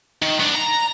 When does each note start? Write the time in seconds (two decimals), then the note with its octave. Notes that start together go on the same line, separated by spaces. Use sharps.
0.22 D#3
0.40 B3 D4
0.56 A#5